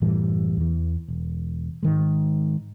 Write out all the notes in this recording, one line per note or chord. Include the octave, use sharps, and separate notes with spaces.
F#1 A2 E3 G3
E2 E3
E1
G#2 D#3 G#3